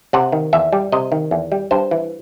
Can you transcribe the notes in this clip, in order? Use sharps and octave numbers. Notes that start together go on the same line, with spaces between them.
C3 F#5
D#3
E2 E5
G3
C3 D#5
D#3
E2
G3
G2 C5
E3